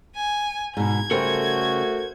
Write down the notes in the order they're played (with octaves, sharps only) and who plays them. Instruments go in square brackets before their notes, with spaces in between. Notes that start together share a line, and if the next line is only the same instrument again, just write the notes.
[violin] G#5
[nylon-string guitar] G#2 B2 [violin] G#6
[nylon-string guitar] C#3 G3 G4 [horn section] A3 F#4 [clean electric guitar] A4 A#4 C5